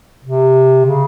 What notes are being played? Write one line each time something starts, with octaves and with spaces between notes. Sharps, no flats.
C3
C#3